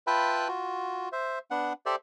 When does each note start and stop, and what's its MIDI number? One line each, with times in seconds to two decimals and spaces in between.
0.07 0.48 65
0.07 0.48 71
0.07 0.48 76
0.07 0.48 79
0.07 0.48 81
0.07 0.48 83
0.48 1.09 65
0.48 1.09 66
1.12 1.39 72
1.12 1.39 76
1.51 1.73 59
1.51 1.73 62
1.51 1.73 78
1.86 1.96 67
1.86 1.96 69
1.86 1.96 72
1.86 1.96 74
1.86 1.96 76